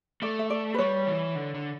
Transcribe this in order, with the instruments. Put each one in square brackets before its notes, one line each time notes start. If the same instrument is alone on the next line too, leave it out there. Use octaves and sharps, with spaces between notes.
[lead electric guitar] A3 [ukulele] D5
[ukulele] E5
D5
B4
[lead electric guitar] G3 [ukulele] C#5
[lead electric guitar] E3
D3
D3